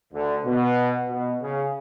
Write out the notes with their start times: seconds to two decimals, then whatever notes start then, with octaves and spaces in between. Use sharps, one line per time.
0.12 D2 D3
0.44 B2
1.09 B2
1.41 C#3